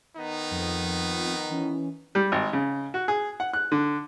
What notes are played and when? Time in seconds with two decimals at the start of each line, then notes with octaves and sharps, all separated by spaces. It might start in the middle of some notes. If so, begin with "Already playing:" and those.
0.17 D#3 B3 D#4
0.51 F2
1.50 E3 C#4
2.15 G3
2.32 G#1
2.53 C#3
2.94 F#4
3.08 G#4
3.40 F#5
3.53 F#6
3.72 D3